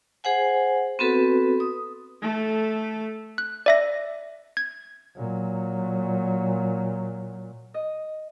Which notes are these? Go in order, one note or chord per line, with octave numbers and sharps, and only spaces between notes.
G#4 C5 F#5 G#5
B3 C4 F#4 A4 B4
D#6
A3 A4
F#6
D5 E5 A#6
G#6
A#2 F#3
D#5